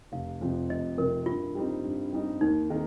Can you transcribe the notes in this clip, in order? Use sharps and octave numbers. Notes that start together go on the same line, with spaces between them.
F1 F5
F2 C3 F3
F1 D#5
F2 C3 F3 A#4
G2 F4
G3 C4 D#4
G2
G3 C4 D#4
D#2 D#4
D#3 C4